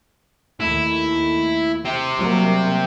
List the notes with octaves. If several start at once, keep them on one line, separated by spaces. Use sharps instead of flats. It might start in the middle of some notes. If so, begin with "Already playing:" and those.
D#2 A3 E4
C4 G4
F#3 G3 A#3